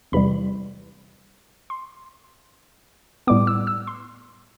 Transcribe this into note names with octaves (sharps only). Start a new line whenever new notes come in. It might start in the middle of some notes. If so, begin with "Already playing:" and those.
E2 C3 E3 G3 B5
C6
A2 G3 B3 D6
E6
E6
C6